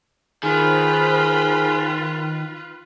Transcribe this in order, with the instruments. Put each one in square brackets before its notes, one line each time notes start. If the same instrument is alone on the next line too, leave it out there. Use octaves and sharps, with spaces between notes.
[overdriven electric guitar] D#3 [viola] F4 B4 [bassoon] G#4 [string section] C5 B5